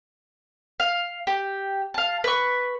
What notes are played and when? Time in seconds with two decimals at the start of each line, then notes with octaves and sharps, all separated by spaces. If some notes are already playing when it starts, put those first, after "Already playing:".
0.80 F5
1.27 G4
1.94 F5 A5
2.24 B4 C#6